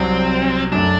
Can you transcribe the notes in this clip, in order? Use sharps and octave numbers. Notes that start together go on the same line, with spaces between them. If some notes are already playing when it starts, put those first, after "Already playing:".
Already playing: C2 C3 F#3 C4
F#2 F#3 A3 D4